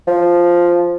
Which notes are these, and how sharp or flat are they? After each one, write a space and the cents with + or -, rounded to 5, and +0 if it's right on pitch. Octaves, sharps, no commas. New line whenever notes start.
F3 -5